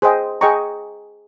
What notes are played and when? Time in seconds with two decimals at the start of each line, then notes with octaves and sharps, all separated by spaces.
0.02 G#4 C5 D#5 G5
0.41 G#4 D#5 G5 A#5 C#6